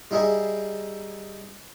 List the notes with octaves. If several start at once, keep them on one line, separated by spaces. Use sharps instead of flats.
G3 D#4 E4 G#4 D#5